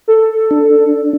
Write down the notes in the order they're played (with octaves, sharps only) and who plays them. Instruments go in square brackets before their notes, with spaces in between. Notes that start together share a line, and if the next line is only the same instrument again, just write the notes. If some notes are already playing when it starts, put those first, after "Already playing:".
[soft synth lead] A4
[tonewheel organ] D4